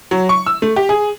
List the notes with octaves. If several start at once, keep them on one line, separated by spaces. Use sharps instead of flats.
F#3
C#6
E6
A3
G4
G#4